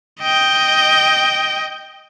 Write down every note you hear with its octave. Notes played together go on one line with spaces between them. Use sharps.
D#5 G5